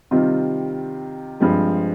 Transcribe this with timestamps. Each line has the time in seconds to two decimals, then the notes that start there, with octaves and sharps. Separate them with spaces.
0.11 C3 D#3 G3 C4 F4
1.40 G2 F3 G#3 C4